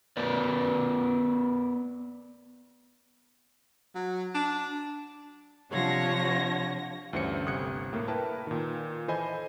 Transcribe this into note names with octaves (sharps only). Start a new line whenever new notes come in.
B3 A#4 B4 D5
F#3
D4
C3 F3 D4 C#5 F#5 A#6
D2 G2 E3 C#4 C5 C#7
G1 C3 D#6 F#6 G#6 C#7
A2 A#3
E4 A#4 B4 G5 A5
A#2 D#3
E3 A4 C5 D#5 G#5 B5